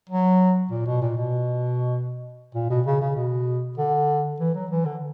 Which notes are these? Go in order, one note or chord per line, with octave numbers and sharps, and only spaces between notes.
F#3
A#2
B2
A#2
B2
A#2
B2
C#3
C#3
B2
D3
E3
F#3
E3
D3